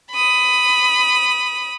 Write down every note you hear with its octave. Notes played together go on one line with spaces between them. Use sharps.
B5 D#6